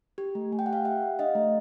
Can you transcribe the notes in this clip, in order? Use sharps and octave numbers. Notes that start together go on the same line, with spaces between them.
G4
A3
A3 G#5
G5
F#5
G4 F5 G5
G4 E5 F#5
G4
D4 D#5 F5
A3